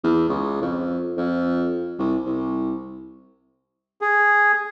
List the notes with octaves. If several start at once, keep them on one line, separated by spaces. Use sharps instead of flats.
E2
C#2
F2
F2
C2
C2
G#4